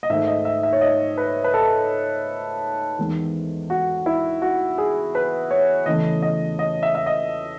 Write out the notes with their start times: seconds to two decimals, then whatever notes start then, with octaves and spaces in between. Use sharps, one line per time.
0.03 D#5
0.09 G#2 D#3 A3 E5
0.27 D#5
0.45 E5
0.63 E5
0.73 C#5
0.81 D#5
1.17 B4
1.44 B4
1.54 A4
2.99 E2 D#3 G#3
3.70 F#4
4.06 E4
4.42 F#4
4.78 G#4
5.15 B4
5.51 C#5
5.86 E2 C#3 E3 A3 D#5
6.22 D#5
6.59 D#5
6.83 E5
6.95 E5
7.06 D#5